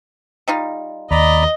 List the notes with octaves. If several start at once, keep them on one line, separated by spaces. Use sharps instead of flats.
G3 D#4 F4
D#2 D5 D#5 A#5 B5